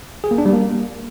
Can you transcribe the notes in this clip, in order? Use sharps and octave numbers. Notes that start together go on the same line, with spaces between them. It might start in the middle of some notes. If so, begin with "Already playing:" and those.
G#4
A#3
D4
G3
A#3